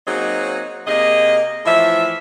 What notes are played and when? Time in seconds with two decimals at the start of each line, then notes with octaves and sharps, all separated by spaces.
0.07 F#3 A#3 C4 D#4 G#4 D#5
0.87 C3 A#3 G#4 D#5
1.66 A2 E3 F3 E5